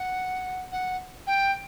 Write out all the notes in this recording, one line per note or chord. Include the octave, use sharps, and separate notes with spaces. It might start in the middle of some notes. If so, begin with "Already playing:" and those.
Already playing: F#5
F#5
G5